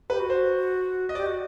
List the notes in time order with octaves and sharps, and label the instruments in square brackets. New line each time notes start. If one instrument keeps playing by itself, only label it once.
[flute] G4 [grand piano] B4
[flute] F#4
[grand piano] C5
D#5
[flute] G4 [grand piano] D5
[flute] F#4